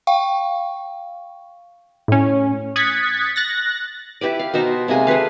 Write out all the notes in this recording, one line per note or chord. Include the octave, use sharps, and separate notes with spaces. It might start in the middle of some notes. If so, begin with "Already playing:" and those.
F5 G5 C#6
A2 C#4
D#6 F#6 G#6 A6 B6 C#7
F#6 A6 A#6
E4 G4 B4 D5
F5
B2 D#4 C5 A#5
C3 G#3 A#3 G#5
G#4 A4 B4 F5